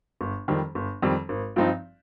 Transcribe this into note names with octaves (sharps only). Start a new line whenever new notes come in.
G1
F2 D#3 G3 C4
G1
F2 D#3 G3 C4
G#1
G2 F3 C4 D#4